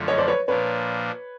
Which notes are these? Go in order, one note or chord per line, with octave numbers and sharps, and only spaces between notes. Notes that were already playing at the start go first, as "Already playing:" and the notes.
Already playing: F#2 D3 F3 A3
C#5 D#5
C5 D5
B4 C#5
A#2 F3 A#3 D4 B4 C#5